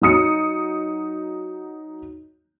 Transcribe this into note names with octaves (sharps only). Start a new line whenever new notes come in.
F#3 D#4 D#6 C#7